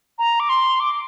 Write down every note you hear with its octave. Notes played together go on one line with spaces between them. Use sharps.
A#5
D6
C6
D6